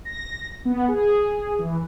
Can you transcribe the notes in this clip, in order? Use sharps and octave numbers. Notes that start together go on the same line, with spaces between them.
A#6
B3
G#4
E3